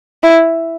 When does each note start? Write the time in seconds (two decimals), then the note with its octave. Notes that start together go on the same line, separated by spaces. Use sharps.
0.23 E4